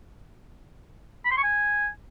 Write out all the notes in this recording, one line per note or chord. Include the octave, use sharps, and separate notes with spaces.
B5
C6
C#6
G#5